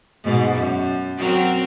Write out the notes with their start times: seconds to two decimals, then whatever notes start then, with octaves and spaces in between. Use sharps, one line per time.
0.24 G#2 B2
0.54 F#2
1.17 F#3 C4 A#4